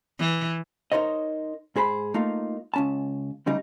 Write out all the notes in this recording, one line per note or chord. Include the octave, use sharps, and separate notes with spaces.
E3
D#4 A#4 C5 C#5 D#5
G#2 G#4 C5 B5
A3 A#3 D#4 F4
C#2 C#4 A5
D2 C#3 G3 D#4